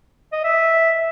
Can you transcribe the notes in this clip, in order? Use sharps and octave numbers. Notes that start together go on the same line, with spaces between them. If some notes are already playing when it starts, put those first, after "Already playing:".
D#5
E5